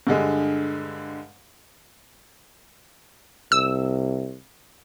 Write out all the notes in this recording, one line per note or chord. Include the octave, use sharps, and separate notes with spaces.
G2 D3 G#3
C2 E6